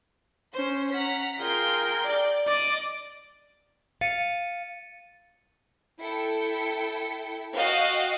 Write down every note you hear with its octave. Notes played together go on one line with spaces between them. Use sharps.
C#4 C5
F#5 A#5 B6
F4 G#4 A#4 G5 G6
D5
D5 D#5 D6
F5 A6 C#7 D#7
E4 A4 G5 C#7
F#4 D#5 F5 G5